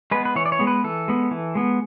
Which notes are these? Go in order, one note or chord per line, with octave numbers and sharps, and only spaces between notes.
G#3 B3 B4
B4
E3 C#5
D5
C#5
G#3 B3
B4
E3 A4
G#3 B3
E3
G#3 B3